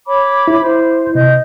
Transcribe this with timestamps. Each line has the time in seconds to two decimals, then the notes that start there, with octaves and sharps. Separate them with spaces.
0.07 C#5 B5 D6
0.48 E4
0.62 C5
1.15 C3 D#5 G6